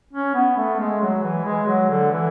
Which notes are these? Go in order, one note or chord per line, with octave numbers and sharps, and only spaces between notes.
C#4
B3
A3
G#3
F#3
E3
G#3
F#3
D3
E3